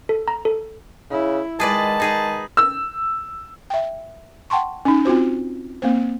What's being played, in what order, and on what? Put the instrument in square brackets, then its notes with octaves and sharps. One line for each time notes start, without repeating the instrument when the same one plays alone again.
[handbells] A4
A#5
A4
[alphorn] C#3 [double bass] E4
[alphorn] D#3 [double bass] G#3 [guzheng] G#4 B4 D5 [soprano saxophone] A5
[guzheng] D#4 G#4 B4
[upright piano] E6
[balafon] E5 G5
F#5 G5 A5 C6 C#6
C#4 D#4
C4 F4 F#4 C5
A#3 C4 C5